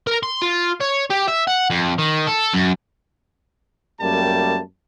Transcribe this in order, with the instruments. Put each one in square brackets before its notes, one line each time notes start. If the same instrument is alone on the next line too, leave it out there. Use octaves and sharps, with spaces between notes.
[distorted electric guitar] A#4
C6
F4
C#5
G4
E5
F#5
F2
D#3
A4
F#2
[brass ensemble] F#2 G3 A3 A#3 G5 A5